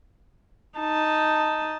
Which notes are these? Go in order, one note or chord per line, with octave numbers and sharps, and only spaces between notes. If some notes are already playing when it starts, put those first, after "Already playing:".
D#4 A5